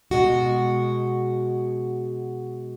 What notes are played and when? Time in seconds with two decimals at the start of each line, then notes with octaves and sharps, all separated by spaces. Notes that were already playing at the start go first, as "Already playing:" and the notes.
0.11 B2 G#3 F#4